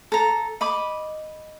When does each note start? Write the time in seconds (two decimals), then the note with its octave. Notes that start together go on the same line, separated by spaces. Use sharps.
0.12 A4 A#5
0.61 D#5 B5 D6